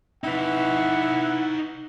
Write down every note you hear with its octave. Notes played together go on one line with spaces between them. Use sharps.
D#4 E4 B4 F#5